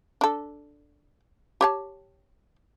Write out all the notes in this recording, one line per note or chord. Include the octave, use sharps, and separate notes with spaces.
D4 A4
G4 C#5 A5